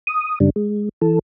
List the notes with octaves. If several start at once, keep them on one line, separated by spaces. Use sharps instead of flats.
D#6
F#2 C#3 G3 D4
G#3
E3 A4